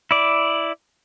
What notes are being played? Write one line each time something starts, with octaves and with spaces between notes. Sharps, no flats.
E4 D5